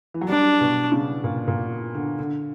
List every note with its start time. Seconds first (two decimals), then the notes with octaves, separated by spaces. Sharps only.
0.14 E3
0.21 F#3
0.28 G3 D4
0.61 B2
0.92 C#3
1.24 A#2
1.48 A#2
1.95 D3
2.19 D3